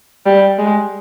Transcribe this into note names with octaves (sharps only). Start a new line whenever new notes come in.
G3
G#3